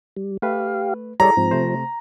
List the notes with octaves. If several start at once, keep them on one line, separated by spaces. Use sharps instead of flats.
G3
A3 G4 B4 F5
G3 E4 G#4 A4 C#5 D5 A#5
G#2 F3 C4
C3 A3 C5